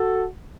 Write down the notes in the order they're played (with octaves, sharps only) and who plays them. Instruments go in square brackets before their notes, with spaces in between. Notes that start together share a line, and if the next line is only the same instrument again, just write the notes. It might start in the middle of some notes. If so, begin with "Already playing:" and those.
Already playing: [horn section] F#4 A4